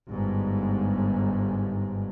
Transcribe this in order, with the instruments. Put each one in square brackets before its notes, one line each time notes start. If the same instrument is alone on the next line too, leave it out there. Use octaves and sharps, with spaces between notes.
[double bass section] G1 G#2